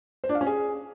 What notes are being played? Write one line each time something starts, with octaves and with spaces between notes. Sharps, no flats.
C5
D4
F5
C#4
G#4